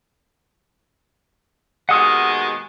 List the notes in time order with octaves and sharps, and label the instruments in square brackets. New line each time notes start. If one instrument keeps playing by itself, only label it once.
[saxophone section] D#2 B2 G#3 [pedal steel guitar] F#5 D#6 F6